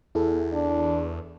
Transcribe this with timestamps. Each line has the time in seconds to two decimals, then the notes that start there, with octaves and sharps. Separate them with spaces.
0.15 E2 E4 G#4 A4
0.52 D4